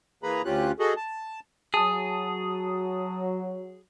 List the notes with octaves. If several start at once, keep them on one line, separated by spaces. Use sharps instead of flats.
E3 A#3 G#4 B4 A#5 B5
D2 C#4 F4 G4 F#6
F#4 G#4 A4 D#5
A5
F#3 G#4 A5 D#6